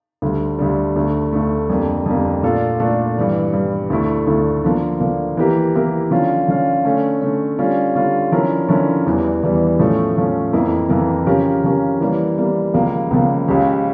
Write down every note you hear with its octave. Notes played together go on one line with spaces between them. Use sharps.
D2 D3 G3
D2 D3 G3
D2 D3 A3
D2 D3 A3
F2 D3 G3 A#3
F2 D3 G3 A#3
A#2 A3 D4 F4 A4
A#2 A3 D4 F4 A4
G2 E3 G3
G2 E3 G3
D2 D3 A3 E4
D2 D3 A3 E4
D3 F3 A#3
D3 F3 A#3
E3 A#3 E4 G4 A#4
E3 A#3 E4 G4 A#4
D3 F3 C#4 F4
D3 F3 C#4 F4
D3 A3 C#4
D3 A3 C#4
D3 G3 C#4 F4
D3 G3 C#4 F4
D3 F3 C#4 E4 A#4
D3 F3 C#4 E4 A#4
E2 E3 G3
E2 E3 G3
A2 F3 A3 C#4
A2 F3 A3 C#4
F2 E3 A#3 E4 A#4
F2 E3 A#3 E4 A#4
C#3 F3 C#4 G4 A#4
C#3 F3 C#4 G4 A#4
E3 G3 A#3
E3 G3 A#3
C#2 C#3 F3 A#3
C#2 C#3 F3 A#3
C#2 C#3 F3 C#4 G4